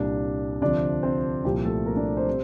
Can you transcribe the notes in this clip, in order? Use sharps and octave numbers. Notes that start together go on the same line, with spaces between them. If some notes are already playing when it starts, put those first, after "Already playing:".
Already playing: C2 A#2 G3 D4 D5
D2 C3 F3 D4 D5
C4 C5
C2 A#2 F3 G3 G4
A3 A4
A#3 A#4
D4 D5
C4 C5
C3 G3